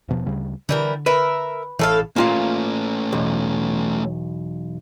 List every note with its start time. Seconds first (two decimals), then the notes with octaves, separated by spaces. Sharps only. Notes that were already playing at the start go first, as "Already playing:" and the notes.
0.08 D#1 B2 F3
0.26 D2 C#3 G3
0.69 D3 E3 G3 A#4
1.06 A#4 B4 E5
1.79 A1 A2 E3 A4 F5
2.16 A3 A#3 C#4 F4 F5
3.13 B1 E2